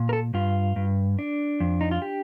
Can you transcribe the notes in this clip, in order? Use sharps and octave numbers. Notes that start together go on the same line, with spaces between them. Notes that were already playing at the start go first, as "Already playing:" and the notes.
Already playing: A#2
A#4
A4
G2 F4
G2
D4
F2
D#4
F4
G4